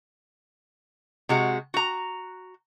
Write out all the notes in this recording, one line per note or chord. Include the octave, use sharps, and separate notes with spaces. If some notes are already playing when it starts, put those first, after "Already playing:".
C3 G#3 F#4
F#4 A#5